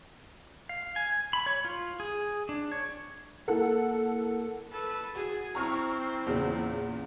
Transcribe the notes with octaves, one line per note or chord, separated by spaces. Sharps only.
F5
G#5
B5
C#5
F4
G#4
D4
C#5
A#3 E4 A4 A#4 F#5
A4 B4
F#4 G#4
C4 E4 A#5 C#6 F6
E2 A#2 C#3